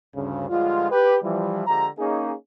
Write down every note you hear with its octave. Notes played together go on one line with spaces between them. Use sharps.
D2 G2 C#3
G2 D3 F3 G#3 F4
G4 B4
E3 F3 G3
D3 F3 G#3 G4 A#5
A#3 C#4 D#4 G#4